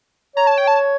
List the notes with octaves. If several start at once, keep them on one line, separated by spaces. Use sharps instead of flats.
C#5 A#5
A5
G5
A5